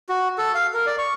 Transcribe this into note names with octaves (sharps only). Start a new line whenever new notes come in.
F#4
A4
F5
A#4
D5
C#6